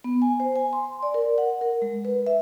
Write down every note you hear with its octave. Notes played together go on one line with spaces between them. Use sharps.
B3
G#5
C5
G#5
C6
D5
A#4
F#5
A#4
G#3
B4
E5